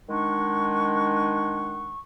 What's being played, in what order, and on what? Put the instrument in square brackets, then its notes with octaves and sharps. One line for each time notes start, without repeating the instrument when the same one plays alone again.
[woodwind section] D#3 G#3 D4 D#4 F#5 C#6